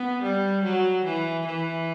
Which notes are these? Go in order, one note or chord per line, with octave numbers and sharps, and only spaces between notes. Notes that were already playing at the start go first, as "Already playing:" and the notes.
Already playing: B3
G3
F#3
E3
E3